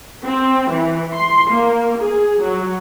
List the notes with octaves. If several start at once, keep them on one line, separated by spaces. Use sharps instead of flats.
C4
E3
C6
A#3
G#4
F#3